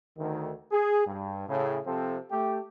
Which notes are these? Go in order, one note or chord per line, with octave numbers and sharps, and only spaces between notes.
D2 D#3
G#4
G2
A2 C#3
C3 F3 C4 A4
A3 G4